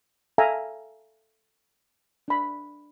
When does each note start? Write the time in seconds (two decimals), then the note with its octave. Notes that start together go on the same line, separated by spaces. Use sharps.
0.38 A4 E5 F5 G#5 A#5
2.28 D4 B5